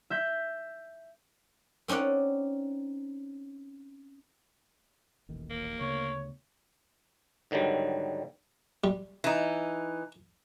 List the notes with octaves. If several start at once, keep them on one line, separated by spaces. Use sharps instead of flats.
E5 G6 B6
C4 C#4 D#4 D5 F#5
D#1 A1 D#3
A#3
D2 C#3 B3 C#5
G#2 D3 D#3 F#3 G3
G3
E3 D#4